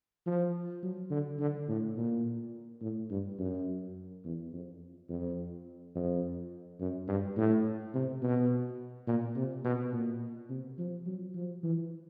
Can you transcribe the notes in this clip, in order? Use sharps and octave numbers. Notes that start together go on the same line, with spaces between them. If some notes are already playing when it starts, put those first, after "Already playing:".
F3
F#3
D3
D3
A2
A#2
A2
G2
F#2
E2
F2
F2
F2
F#2
G2
A2
C3
B2
A#2
C3
B2
A#2
C3
F3
F#3
F3
E3